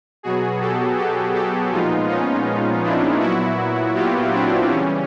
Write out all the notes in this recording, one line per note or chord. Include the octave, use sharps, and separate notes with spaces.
B2 F#3 B3 F#4 G#4
G4 A4
G4 A4
G4 A4
A#2 F3 G#3 B3 D#4 F4
C#4 D#4
D4 E4
A#2 F#3 B3 E4 F#4
F4 G4
C4 D4
C#3 E3 G3 C#4